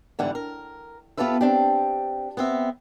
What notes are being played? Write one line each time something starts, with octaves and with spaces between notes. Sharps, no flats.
E2 G#2 D3 E3 G3 F#5
A#4
B3 F4 G4 A4 B4 E5
C4 D4 G4
B3 C4 E5